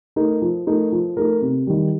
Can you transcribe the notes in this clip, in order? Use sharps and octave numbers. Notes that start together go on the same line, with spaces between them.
A3 D#4 A#4
F3
A3 D#4 A#4
F3
A3 D#4 A#4
C3
D#3 G3